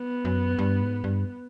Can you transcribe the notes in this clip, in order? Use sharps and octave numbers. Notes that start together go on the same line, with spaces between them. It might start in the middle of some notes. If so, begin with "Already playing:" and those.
Already playing: B3
F#2
G2
G#2
G2